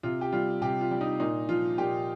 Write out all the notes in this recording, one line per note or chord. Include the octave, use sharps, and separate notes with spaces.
C3 F4
G4
G3 F4
C3 G4
F4
G3
D#4
A#2 D#4
F3 F4
A#2 G4